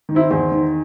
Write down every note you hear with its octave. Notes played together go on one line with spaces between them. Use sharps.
D#3
C4 E4
E2 C4
D#3